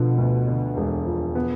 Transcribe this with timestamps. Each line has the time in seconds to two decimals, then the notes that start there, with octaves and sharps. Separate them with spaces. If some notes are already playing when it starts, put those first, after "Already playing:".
Already playing: B2 D3 F3
0.18 D2
0.47 D3
0.77 E1
1.06 F3
1.35 B3